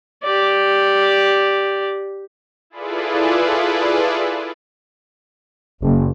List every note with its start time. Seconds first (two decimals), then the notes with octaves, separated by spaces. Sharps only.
0.23 G4 D5
2.70 E4 F4 G#4 A4 B4 D5
5.82 F#1